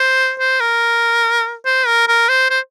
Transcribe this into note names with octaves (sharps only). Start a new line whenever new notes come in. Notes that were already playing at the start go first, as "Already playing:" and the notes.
Already playing: C5
C5
A#4
C5
A#4
A#4
C5
C5